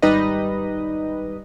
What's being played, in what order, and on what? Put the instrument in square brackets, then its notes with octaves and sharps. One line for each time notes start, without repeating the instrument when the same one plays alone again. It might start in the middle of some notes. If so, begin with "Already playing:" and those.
[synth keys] G#1 G3 D#4 B4 D#5